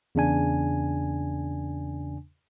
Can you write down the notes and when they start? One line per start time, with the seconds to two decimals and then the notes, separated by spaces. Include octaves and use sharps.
0.15 E2 C#3 D4 G#5